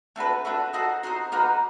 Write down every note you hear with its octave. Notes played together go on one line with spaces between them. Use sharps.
A3 D4 F#4 B4
A3 D4 F#4 B4
D#4 F#4 A4 C5
D#4 F#4 A4 C5
A#3 D#4 F#4 B4